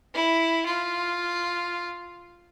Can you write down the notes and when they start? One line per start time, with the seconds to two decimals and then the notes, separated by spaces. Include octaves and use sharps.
0.15 E4
0.66 F4